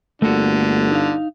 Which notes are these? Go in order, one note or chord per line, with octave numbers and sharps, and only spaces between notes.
G1 D3 A3 A#3 F#4
D#4 F5